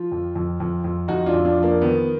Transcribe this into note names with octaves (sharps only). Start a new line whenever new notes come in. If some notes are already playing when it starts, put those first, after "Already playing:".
Already playing: F3 F4
F2
F2
F2
F2
F2 D#4 F#4
D4 F4
F2
D4 F4
F3
A#3 D4
D#3 B3